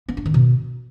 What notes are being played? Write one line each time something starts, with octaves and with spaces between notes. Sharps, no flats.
B3
D4
D#3
B2